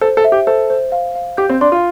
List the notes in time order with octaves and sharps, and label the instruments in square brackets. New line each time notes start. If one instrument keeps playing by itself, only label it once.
[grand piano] A4 [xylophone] C5
[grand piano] A4
[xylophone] E5
[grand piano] G4
[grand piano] A4 [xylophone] C5
[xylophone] C5
F5
F5
[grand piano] G4 [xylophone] G6
[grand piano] C4
[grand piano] D4 [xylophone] C6
[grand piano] F4